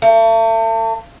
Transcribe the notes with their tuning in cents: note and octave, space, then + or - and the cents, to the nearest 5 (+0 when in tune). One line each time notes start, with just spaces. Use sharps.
A3 +40